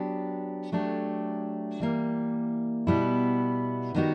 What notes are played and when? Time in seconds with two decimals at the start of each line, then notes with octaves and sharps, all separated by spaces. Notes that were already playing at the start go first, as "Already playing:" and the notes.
Already playing: F#3 B3 D4 G4
0.72 F#3 A3 D4 G4
1.80 E3 G3 A#3
2.87 B2 G3 B3 E4
3.95 D#3 G3 B3 D#4 F#4